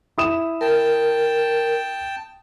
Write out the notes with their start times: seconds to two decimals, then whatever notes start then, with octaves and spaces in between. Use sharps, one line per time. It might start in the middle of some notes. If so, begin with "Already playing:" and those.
0.18 E4 D#6 E7
0.61 A#4 G5 A5